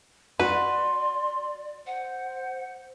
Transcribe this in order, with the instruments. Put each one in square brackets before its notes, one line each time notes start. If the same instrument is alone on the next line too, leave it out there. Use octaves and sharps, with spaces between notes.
[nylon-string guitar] F#4 [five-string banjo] B4 [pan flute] D5 [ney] C6
[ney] C5 [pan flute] F#5